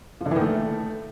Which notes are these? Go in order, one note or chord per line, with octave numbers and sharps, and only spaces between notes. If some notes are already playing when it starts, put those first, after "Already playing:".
F3
D3
E3
D#3
A3